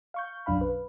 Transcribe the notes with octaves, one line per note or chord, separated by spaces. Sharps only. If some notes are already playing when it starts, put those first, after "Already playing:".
F5 C#6 G6
B1 F#2 D4 F5 B5
B4